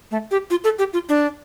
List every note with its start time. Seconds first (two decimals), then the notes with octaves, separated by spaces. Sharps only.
0.11 A3
0.31 G4
0.50 F4
0.64 A4
0.79 G4
0.93 F4
1.09 D4